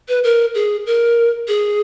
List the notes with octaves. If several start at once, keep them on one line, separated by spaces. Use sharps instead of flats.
B4
A#4
G#4
A#4
G#4